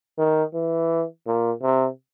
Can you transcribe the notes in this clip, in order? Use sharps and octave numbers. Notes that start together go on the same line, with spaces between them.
D#3
E3
A#2
C3